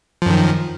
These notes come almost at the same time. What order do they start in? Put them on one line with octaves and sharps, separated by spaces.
F3 F#2 D#3